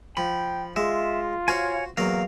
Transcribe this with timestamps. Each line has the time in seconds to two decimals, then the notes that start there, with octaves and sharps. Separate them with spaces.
0.17 F3 G5 B5
0.76 G#3 F4 E5
1.48 F#4 C5 C#5 F5 G#5
1.97 E2 F#3 A#3 F5